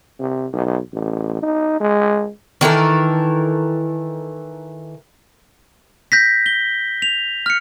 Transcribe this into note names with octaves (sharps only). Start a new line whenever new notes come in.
C3
B1
A1
D#4
G#3
D#3 E3 A4 A#4
G6 A#6 B6
G7
F7
F6 C#7